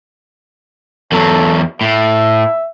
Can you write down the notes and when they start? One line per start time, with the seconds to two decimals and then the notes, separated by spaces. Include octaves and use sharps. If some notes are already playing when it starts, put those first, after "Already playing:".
1.12 E2 F#3 A4
1.81 A2 E5